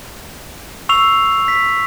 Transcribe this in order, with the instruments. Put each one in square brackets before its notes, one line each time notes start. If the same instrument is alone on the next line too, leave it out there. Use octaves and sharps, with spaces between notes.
[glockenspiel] C#6 E6 C7 F7
B6